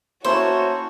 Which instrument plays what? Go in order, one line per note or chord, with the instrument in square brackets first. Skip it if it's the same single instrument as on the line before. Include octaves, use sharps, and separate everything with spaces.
[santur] A#3 C#4 A5 [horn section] E4 C#5 [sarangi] F#4 [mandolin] C5